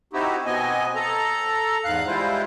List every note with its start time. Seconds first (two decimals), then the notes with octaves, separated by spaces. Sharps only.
0.13 C4 D#4 E4 F#4 G4
0.46 B2 B3 C4 D#5 G#5
0.95 A4 A#5
1.85 E2 G#2 F5 F#6
2.07 G3 G#3 E4 F4 C5